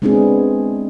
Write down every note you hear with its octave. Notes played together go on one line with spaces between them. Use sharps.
G#3 B3 C4 D4 E4 G#4